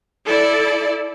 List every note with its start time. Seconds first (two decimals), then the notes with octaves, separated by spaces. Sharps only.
0.25 E4 A4 D5